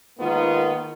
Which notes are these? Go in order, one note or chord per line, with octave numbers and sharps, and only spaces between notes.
G#2 D#3 A#3 B3 F4